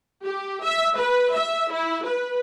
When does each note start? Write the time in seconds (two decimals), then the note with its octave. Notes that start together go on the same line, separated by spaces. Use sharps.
0.25 G4
0.63 E5
0.97 B4
1.34 E5
1.72 E4
2.06 B4